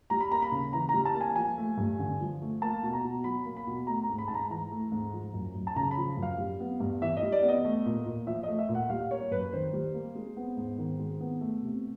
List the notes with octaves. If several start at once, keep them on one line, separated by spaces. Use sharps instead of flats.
G3 A#5
B5
A#3 A#5
B5
C#3
E3 A#5
G3 A#5
A5
A#3
G#5
F3 G#5
A3
G2
D3
F3
A3
A#3 A5
B2
A#5
B2
F#3 B5
A#3
B5
B2
A3 A#5
A#5
G#2
B5
G#2 A5
A#5
E3 A#5
A3
G#2
F3
F#2
F#2
A5
C#3 A#5
B5
F3
F#2
F5
G3
B3
G2
E3 E5
D#5
G3
D5
B3
D#5
A3
A#2
A#2
F3 E5
A3 D#5
E5
A#2
F#5
G3 F5
A#3 C#5
F#2 B4
D#3 C5
G3
A#3
G#3
B3
G#2
D#3
G#3
B3
A3
C3